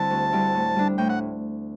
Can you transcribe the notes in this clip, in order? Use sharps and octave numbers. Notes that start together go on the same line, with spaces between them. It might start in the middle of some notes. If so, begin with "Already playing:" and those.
Already playing: D3 G3 C4 E4 A5
D2
D3 G3 C4 E4
A2
G3 D4
A2 G5
F#5